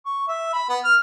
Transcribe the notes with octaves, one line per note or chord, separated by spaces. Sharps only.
C#6
E5
B5
B3
F6